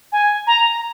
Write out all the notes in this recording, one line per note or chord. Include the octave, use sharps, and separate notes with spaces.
G#5
A#5